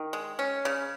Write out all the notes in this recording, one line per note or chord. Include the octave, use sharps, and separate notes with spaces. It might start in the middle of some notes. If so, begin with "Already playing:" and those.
Already playing: D#3
G#3
C#4
C#3